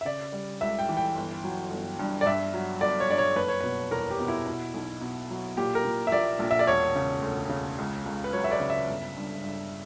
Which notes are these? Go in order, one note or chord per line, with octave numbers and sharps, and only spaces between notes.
E5
C#3 D5
G3
C#2 E5
G5
E3
G5
G1
F#3
G1
G2
D5
G2 E5
F#3
G1 D5
C#5
G2 D5
C#5
F#1 B4
C#5
B2 B4
E2 A#4
G4
B2
E4
B2
B1
B2
F#3
A#2 G4
A#4
A#2
E5
A#1 D5
A#1
E5
D5
E1 C#5
C#3
D2
C#3
C#2
C#2
B4
F#3 C#5
E5
D5
C#3
E5
G1
G2
G2